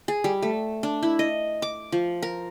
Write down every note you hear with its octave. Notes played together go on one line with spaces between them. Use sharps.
G#4
G3
A3
D4
E4
D#5
D6
F3
A#4